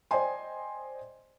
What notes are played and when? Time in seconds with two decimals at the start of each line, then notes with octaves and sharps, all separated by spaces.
0.11 C5 D5 D#5 G5 G#5 C6